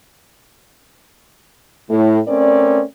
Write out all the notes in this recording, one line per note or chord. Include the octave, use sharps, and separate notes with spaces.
A2
A3 C4 C#4 A#4 D5